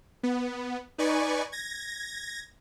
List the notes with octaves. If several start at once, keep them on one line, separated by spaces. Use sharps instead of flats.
B3
D#4 B4 D5 G#5 C#6
G#6 A#6